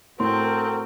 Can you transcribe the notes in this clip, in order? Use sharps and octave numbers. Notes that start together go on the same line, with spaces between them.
A2 C4 F#4 A4 A#4 C6